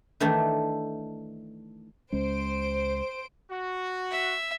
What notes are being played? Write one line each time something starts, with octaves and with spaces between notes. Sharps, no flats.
D#3 E3 A3 D4 D#4
C#2 G#3 C#4 C5 D7
F#4
E5